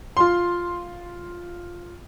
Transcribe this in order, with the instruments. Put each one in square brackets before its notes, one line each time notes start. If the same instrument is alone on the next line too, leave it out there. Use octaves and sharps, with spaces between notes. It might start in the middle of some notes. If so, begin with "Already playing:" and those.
[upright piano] F4 C6